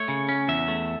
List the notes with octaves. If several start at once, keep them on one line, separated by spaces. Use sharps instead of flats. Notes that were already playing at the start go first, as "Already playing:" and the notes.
Already playing: A3 C#5
C#3
C#4
E2 E5
A3